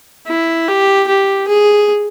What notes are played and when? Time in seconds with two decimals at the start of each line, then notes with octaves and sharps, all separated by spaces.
0.27 E4
0.68 G4
1.07 G4
1.48 G#4